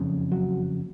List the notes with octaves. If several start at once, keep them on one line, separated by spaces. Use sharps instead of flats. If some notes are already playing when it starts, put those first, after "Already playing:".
Already playing: F#1 F2 C#3
F#3